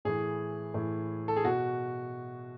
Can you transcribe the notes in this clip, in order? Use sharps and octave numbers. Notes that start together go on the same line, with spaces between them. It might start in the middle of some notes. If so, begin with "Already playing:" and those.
A2 E3 G#4
A2 E3
A4
G#4
B2 F#4